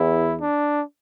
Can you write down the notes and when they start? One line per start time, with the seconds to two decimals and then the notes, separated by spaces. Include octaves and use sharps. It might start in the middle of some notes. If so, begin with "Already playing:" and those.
Already playing: E2 E4
0.41 D4